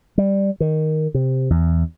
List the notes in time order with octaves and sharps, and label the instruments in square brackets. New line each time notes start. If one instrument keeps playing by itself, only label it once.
[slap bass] G3
D#3
C3
E2